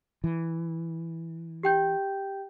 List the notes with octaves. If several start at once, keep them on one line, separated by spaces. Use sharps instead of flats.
E3
G4 G5 G6